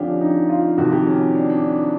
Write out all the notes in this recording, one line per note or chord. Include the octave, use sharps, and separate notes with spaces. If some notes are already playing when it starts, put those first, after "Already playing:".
Already playing: F2 D3 F3 C#4 D4 G4
D#4
F4
F2 C3 D#3 F#4
G4
C#4
D4
D4